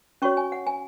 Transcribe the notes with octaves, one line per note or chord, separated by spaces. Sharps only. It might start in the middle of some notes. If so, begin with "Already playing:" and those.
C#4 F#4 C#5 C#6
G#5
F#5
G#5